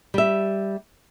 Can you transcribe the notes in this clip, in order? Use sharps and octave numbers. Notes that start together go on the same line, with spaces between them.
G3 E5